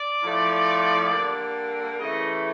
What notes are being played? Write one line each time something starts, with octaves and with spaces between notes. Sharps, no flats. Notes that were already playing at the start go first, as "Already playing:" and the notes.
Already playing: D5
A2 F3 A3
D3 G3 A#3
C#3 E3 A3 D#5